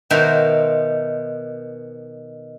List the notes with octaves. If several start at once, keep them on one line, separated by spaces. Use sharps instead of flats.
B2 D#3 C5 E5 G#5 A#5